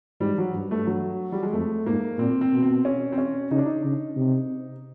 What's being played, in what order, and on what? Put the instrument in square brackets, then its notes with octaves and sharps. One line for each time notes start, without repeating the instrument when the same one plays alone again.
[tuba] G#2 [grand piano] G3
[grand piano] F#3
[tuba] G2
[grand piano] A3
F#3
G3
G#3
[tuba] F2 [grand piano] A3
[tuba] G#2 [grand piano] A#3
[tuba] A#2 [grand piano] C4
[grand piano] C4
[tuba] B2
[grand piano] C4
C#4
C4
C#4
[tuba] C#3 [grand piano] D#4
[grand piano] D4
D#4
[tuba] C#3
C3